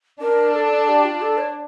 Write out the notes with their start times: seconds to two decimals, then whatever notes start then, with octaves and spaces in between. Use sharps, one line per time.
0.21 D4 A#4
0.55 A4
0.88 G4
1.05 F4
1.22 A4
1.38 C#5